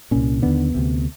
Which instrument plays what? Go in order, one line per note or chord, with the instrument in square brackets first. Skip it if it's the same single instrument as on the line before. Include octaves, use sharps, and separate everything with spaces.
[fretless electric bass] C2 A#2 C#4
D#2 D3 B3
D2 C3